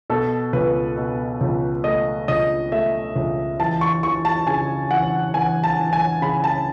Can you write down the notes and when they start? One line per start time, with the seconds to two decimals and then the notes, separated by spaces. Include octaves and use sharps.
0.10 B2 A4
0.53 C#2 B4
0.97 B2
1.41 C#2
1.84 A3 D#5
2.28 C#2 D#5
2.72 A3 E5
3.16 C#2
3.60 E3 A5
3.81 C#6
4.03 E3 C#6
4.25 A5
4.47 C#3 G#5
4.91 E3 F#5
5.34 E3 G#5
5.64 A5
5.78 E3
5.93 G#5
6.22 C#3 B5
6.44 A5